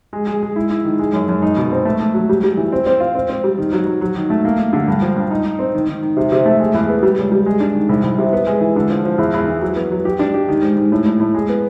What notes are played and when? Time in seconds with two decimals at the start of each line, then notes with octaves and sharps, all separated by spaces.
0.13 G#3
0.27 G#3
0.42 G#3
0.56 E4
0.70 E4
0.85 D#3
0.99 G#3
1.13 F#2
1.28 F#2
1.42 D#4
1.57 B2
1.72 C4
1.85 A3
2.00 A3
2.14 F#3
2.29 G3
2.43 G3
2.57 E3
2.72 C4
2.86 C4
3.00 F4
3.15 C4
3.29 C4
3.44 G3
3.58 D#3
3.73 F#3
3.86 F#3
4.01 F#3
4.16 D#3
4.30 A3
4.45 A#3
4.59 A#3
4.73 D3
4.88 G2
5.02 F3
5.16 G2
5.31 D#4
5.45 D#4
5.59 C4
5.74 D#3
5.89 D#3
6.02 D#3
6.17 C3
6.32 C3
6.45 A3
6.60 G#3
6.74 E2
6.89 B3
7.03 G3
7.18 C#2
7.32 G3
7.46 G#3
7.60 D4
7.75 D#3
7.89 C2
8.04 C2
8.18 C3
8.33 B3
8.47 G#3
8.61 E3
8.76 D3
8.90 F3
9.05 F3
9.18 E2
9.34 E2
9.48 E3
9.61 F#3
9.76 B3
9.91 F#3
10.05 G4
10.19 D4
10.34 G4
10.48 D#3
10.62 G#2
10.77 G#2
10.92 A2
11.06 A2
11.20 A2
11.34 G#3
11.49 B3